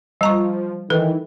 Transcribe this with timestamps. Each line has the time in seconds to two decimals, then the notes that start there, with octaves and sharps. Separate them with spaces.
0.21 F3 G3 A#5 C#6
0.90 D#3 E3 A4 B4